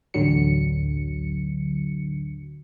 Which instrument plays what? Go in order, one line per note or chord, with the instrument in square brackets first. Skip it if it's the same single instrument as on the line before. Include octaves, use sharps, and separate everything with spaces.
[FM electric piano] A1 D2 D3 F#3 C#7